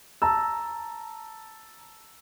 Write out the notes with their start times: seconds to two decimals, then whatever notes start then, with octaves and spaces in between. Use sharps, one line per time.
0.22 A5 A#5 E6